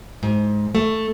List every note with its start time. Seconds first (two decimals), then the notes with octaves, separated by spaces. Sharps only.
0.23 G#2
0.75 A3